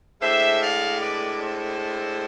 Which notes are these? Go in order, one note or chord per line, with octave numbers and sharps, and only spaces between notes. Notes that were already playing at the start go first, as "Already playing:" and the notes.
A2 G#3 D4 C5 E5
D5 F5
B4 D5
A4 C5